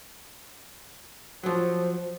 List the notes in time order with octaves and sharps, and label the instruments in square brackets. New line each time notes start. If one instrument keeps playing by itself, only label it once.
[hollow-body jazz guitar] F3 F#3 [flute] C5